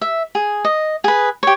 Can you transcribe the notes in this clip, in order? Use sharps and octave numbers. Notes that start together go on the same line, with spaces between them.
E5
G#4
D#5
G#4 B4
G4 C#5